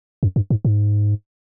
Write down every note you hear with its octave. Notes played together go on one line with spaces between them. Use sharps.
F#2
G2
G#2
G#2